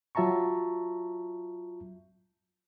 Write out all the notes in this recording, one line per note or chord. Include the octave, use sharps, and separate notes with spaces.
F#3 F4 E5 A5 A#5 C#6